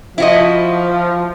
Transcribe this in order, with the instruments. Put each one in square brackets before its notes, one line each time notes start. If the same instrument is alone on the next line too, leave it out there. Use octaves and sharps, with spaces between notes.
[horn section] F3 [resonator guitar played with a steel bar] E4 F#4 D#5